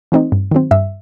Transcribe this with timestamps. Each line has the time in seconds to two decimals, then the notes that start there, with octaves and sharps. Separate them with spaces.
0.12 E3 A3 C4 D#4
0.32 G2
0.51 D#3 F#3 C4
0.71 G2 E5